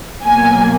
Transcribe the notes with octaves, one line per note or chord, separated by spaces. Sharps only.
B2 F#3 A#3 G#5